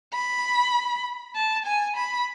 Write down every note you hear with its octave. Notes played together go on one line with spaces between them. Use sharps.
B5
A5
G#5
B5